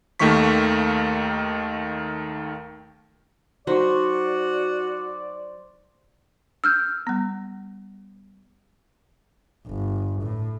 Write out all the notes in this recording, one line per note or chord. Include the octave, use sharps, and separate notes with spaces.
D#2 D#3 A3 A#3 C#6 B6
F#3 D#4 F#4 C5 D5 C#6
E6 F6 G6
G3 B3
G1
A2